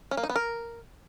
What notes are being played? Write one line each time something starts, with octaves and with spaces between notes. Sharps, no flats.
C#4
A#3
D#4
B3
A#4